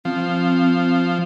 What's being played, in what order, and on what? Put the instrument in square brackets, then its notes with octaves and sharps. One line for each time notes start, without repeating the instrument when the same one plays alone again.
[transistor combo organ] F3 [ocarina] C4